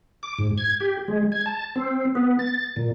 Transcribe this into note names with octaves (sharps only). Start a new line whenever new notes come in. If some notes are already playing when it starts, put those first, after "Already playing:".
D6
G#2
G#6
G4
G#3
G#6
A5
C4
B3
A6
A#2